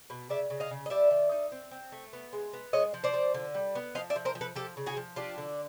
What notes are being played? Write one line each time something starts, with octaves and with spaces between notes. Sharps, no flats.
B2
C#3 D5 E5
C#3
D#5 F5
C#3
D#5
G3 D5 E5
D#3
D#4
C4
C4
A3
B3
G#3
B3
G#3 C#5 D#5
F3
C5 D5
F3
D3
G3
B3
F3 D#5 F5
D5 E5
F3
A#4 C5
F3
A4 B4
F3 G4 A4
C#3
F#4 G#4
F3
D4 F4 G4
D3